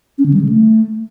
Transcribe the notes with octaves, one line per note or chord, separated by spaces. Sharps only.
C#4
D3
G3
C#3
A3